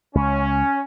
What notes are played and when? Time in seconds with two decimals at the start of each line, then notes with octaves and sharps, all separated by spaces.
0.15 C#2 C#4